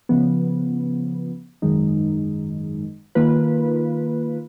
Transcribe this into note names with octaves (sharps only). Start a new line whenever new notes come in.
C#3 F3 B3
G#1 F#2 D#3 G#3 D#4
D#3 A#3 F4 B4